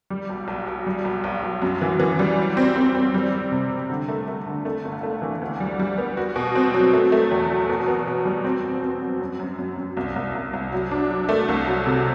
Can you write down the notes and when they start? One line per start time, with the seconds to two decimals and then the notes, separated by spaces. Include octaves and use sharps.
0.10 G3
0.29 B1
0.48 B1
0.67 B1
0.87 G3
1.05 B1
1.24 B1
1.43 B1
1.62 F#2
1.81 E3
2.00 E3
2.19 G3
2.38 F#3
2.57 C4
2.76 C4
2.95 C4
3.14 G3
3.33 G3
3.52 C3
3.71 C3
3.90 D3
4.08 A3
4.28 A3
4.47 D3
4.65 A3
4.85 G1
5.03 A3
5.22 E3
5.41 D2
5.60 G3
5.79 G3
5.98 B3
6.17 F#4
6.36 B2
6.55 C4
6.74 F#3
6.93 A3
7.12 A3
7.31 E2
7.50 F#3
7.69 B2
7.88 B3
8.07 B2
8.25 G3
8.45 C4
8.63 B2
8.83 C4
9.02 F#3
9.20 F#2
9.39 F#2
9.59 F#2
9.77 F#2
9.97 C2
10.16 C2
10.35 C2
10.53 C2
10.72 F#3
10.91 D4
11.10 F#3
11.29 A3
11.48 C2
11.67 F#3
11.86 C3